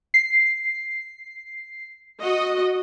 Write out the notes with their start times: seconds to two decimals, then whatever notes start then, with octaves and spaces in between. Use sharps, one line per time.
0.14 C7
2.21 F#4 D#5